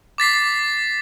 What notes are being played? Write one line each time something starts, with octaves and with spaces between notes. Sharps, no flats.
D6 A6 B6 C7